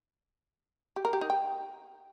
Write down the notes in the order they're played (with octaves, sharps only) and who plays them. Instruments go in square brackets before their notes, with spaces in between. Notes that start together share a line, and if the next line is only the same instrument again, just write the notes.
[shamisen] G4
A#4
G4
D#4
G5